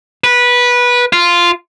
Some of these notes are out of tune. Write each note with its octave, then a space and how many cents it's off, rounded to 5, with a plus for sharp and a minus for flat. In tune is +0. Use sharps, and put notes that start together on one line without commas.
B4 -15
F4 -5